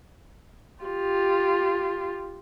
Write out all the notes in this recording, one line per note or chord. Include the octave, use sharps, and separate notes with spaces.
F4 G4